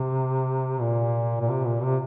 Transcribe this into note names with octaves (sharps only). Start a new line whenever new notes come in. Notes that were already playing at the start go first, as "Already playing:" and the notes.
Already playing: C3
A#2
A#2
C3
A#2
C3